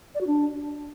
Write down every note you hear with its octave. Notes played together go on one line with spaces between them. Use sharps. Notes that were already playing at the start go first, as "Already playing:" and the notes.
D5
F#4
D4